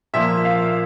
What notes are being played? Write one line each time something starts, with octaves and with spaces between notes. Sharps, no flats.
A#2 F3 A#3 E5
F5